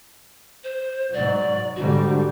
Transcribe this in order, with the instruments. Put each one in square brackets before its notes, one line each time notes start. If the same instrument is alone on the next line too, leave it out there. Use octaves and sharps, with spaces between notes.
[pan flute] C5
[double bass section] G#2 F#3 [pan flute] D5
[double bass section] G#2 D3 G3 [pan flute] F#4